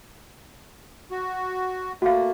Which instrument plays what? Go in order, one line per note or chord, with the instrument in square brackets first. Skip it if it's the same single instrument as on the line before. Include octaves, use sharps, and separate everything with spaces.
[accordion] F#4
[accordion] A3 A#3 [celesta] F#4 F5